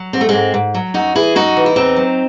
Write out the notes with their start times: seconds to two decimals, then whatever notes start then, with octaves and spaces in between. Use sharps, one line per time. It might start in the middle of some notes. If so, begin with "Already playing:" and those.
Already playing: F#3
0.13 G#2 C4
0.21 A3
0.29 G#2 G#3 C4
0.54 G#2
0.75 F#3
0.94 F#2 D#4 F#4
1.15 E3 E4 G#4
1.35 F#2 D#4 F#4
1.57 E3
1.66 E4
1.76 E2 C4 D#4
1.96 F#3